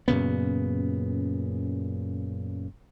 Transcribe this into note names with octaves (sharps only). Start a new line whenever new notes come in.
F#2 A#2 C#3 B3